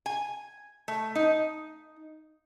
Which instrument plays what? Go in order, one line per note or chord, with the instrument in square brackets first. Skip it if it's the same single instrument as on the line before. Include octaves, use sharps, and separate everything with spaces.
[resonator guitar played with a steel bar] G#5
A3
D#4